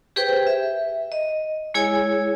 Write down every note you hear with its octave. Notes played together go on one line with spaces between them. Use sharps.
G4 G#4 B4 C5 G5
E5
D#5
G#3 E4 G#4 C#5 G#5